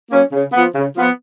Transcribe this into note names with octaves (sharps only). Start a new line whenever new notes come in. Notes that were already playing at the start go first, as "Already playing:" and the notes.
F#3 A#3 C#4
C#3
F3 B3
C#3
F3 B3